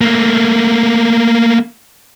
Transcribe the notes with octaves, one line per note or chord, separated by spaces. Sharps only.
A3 A#3